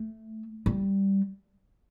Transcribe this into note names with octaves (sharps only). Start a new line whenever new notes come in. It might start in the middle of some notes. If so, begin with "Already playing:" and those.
Already playing: A3
G3